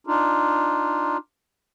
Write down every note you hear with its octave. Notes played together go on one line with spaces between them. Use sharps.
D4 D#4 F4